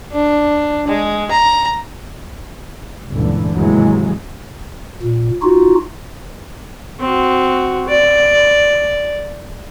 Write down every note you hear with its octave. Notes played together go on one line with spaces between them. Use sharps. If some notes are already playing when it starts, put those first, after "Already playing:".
D4
G#3
A#5
G1 C#2 A#2 D3 E3
D#2 G#2 C3 E3 F#3 G#3
A#2
D#4 F4 F#4
C4 F#4
D5